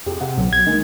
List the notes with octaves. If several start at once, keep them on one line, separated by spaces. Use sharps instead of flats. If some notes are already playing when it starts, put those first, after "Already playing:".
F2 G4 G#4
C3 F#5
B1
B1 G#6
D#3 G#3 A#3